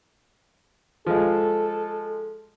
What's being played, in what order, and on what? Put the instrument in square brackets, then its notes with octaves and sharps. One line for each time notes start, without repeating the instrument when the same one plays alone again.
[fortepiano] F3 G#3 [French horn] A4